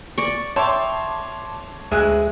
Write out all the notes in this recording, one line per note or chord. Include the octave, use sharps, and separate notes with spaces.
D5 C#6
C#5 E5 G5 A5 C6 D6
D2 G#3 G#4 E5 G#5 F#6